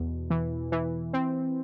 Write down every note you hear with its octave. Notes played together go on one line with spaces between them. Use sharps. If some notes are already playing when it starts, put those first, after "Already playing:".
Already playing: E2 B2
E3
E3
C4